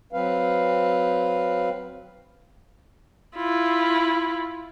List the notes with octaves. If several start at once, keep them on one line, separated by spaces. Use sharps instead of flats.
F#3 C4 B4 F5
E4 F4